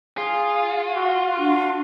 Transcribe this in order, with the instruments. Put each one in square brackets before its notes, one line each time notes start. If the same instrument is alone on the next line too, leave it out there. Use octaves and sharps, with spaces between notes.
[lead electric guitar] F4 [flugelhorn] G#4
[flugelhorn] F#4
[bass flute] D4 [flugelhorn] F#4